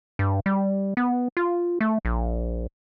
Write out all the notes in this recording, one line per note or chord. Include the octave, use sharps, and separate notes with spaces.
G2
G3
B3
F4
A3
A#1